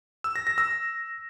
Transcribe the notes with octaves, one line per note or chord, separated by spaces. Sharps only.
E6
A#6
A#6
E6